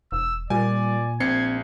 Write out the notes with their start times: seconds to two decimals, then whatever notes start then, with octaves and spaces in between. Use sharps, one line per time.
0.12 E1 E6
0.50 A#2 G3 D5 G#5
1.20 A#1 C4 G#6 C7 C#7